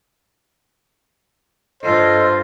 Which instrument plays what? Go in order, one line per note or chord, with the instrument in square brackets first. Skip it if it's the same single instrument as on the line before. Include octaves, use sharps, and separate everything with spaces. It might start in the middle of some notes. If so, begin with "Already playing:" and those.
[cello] G2 F4 [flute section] A4 D5 D#5 [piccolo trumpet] C5